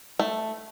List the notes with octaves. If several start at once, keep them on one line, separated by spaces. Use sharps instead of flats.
A3